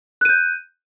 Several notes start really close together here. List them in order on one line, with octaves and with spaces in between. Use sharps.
F#6 D#7 G6